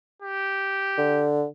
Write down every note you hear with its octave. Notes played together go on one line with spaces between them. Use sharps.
G4
D3